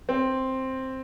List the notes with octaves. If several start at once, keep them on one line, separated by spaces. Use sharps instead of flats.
C4